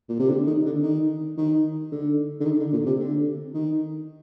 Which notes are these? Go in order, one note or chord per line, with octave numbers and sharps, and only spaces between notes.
A#2
C3
D3
D#3
D3
D#3
D#3
D3
D3
D#3
D3
A#2
C3
D3
D#3